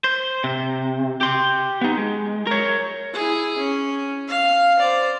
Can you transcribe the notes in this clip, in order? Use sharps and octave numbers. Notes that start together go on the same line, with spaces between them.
C5
C3
G4 C6
B3 D#4
G#3
A#4 C#5
E4 G#4
C#4
F5
C5 D5